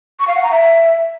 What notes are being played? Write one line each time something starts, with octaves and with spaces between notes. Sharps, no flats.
C#6
F5
F#5
A#5
E5